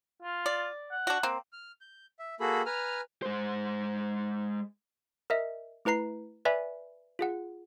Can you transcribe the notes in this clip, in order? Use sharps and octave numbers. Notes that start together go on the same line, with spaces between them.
F4
D5
F#5
D4 F#4
A#3 C4
F6
G6
E5
A#3 F#4 G#4 A4 B5
B4 G#5 A#5 F6
G#3 C5
A#4 D#5 E5
A3 E4 B4 A#5 C7
B4 D5 E5 G#5 B5
F4 G#4 F#5